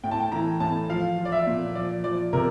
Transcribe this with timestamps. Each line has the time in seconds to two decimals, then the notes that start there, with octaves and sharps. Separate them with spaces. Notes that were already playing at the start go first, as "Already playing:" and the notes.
0.04 A2 G5
0.11 A5
0.20 G5
0.32 E3 A#5
0.60 A2 A5
0.89 F3 F5
1.18 F3
1.25 D5
1.32 E5
1.47 A#2
1.75 F3 D5
2.04 F3 D5
2.33 C3 A#4